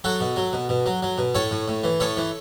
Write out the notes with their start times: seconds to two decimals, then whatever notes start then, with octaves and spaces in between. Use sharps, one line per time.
0.04 F#3 F#4 A4
0.21 B2
0.36 F#3
0.53 B2
0.69 B2
0.86 F#3
1.03 F#3
1.18 B2
1.35 A2 A4 C#5
1.51 A2
1.68 A2
1.84 E3
2.00 A2 A4 C#5
2.17 E3